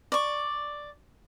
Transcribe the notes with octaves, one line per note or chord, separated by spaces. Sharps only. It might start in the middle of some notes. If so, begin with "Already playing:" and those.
D5 C#6